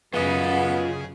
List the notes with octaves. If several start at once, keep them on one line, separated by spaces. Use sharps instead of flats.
F#2 C#3 B3 F4 G#4 D#5